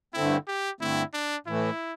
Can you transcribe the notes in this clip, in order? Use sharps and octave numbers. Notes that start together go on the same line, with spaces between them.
G2 D3 A3 C4 E4
G4
G2 D3 A3 C4 E4
D4
A2 E3 A3 E4